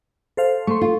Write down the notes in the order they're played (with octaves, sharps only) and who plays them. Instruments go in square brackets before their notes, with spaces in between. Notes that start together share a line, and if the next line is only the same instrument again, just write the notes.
[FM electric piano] A4 C5 F5
[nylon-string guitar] A3 [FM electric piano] C6 C#6
[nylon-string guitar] F4